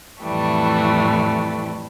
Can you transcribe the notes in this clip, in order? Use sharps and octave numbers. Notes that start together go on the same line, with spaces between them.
F2 A2 E3 G3 A3